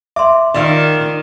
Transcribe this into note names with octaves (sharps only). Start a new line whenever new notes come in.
E5 C6 D6
D#3 F4 D5